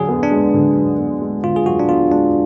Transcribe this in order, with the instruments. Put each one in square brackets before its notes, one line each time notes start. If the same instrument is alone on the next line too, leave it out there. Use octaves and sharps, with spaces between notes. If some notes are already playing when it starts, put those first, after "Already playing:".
Already playing: [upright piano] F#2 D3 [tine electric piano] G#4
[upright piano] B3
[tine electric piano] D4
[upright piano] G#3
D3
F#2
B3
G#3
[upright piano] D3 [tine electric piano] F4
[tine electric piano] G#4
[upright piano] F#2 [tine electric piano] F#4
[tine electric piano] D4
[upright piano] B3 [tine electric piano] F4
[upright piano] G#3 [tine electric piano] D4